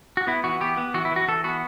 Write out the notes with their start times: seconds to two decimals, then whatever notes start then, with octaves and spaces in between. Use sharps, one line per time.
0.17 F#4
0.27 B3 E4
0.44 E3 F#4
0.60 B3 G4
0.77 B3
0.94 E3 F#4
1.05 E4
1.11 E3 F#4
1.28 E3 A4
1.44 B3 F#4